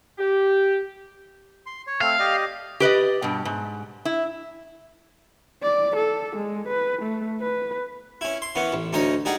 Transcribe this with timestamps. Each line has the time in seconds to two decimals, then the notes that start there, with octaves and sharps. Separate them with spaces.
0.18 G4
1.66 C6
1.87 C#5
2.01 A3 C4 F5
2.19 G4 D5 D#5
2.80 G4 B4 D5 D#5
3.22 G2 B2
3.45 G#2
4.05 E4
5.62 D5
5.96 A4
6.36 G#3
6.68 B4
7.02 A3
7.40 B4
8.21 C#4 E4
8.42 C6
8.55 E3 B3 C#4
8.73 A1
8.93 D2 C#4 D#4 D#5
9.25 G3 D#4 G#4 F#5